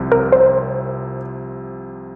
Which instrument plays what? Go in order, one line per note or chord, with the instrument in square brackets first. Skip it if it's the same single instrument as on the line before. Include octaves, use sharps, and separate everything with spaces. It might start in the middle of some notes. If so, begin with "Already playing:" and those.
Already playing: [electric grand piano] C2 C3 F3
[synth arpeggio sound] A#4
C5